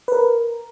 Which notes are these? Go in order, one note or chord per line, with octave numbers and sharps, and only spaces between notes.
B4
A#4